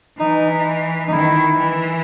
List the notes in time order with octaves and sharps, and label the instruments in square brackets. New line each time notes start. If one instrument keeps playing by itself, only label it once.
[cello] E3 [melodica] D#4
[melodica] D#4
[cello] D#3 [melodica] E4
[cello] E3